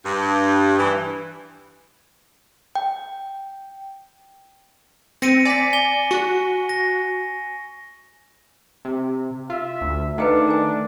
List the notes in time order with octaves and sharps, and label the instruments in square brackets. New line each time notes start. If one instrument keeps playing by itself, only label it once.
[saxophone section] G2
E3
[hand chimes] G5
[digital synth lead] C4 [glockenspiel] A#6 C#7 D#7
[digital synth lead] D5 [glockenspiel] G#5 B6
[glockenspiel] G#5 G7
[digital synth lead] F#4 [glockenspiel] C#6
[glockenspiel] A#6
[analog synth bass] C3
[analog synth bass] F4 [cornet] E5
[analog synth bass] D2
[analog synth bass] D#3 [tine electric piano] A3 D6 C#7 [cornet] D4 [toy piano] B4 F5 F#5
[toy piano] A#4 D5 G#5